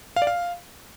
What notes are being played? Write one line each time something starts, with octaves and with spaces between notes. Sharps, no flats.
F5
D5
F5